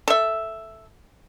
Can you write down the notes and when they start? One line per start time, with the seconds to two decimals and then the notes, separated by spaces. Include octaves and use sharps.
0.08 A4 E5